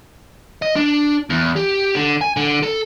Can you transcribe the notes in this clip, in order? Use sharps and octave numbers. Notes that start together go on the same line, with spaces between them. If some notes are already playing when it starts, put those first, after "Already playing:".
D#5
D4
E2
G4
D3
G#5
D3
A4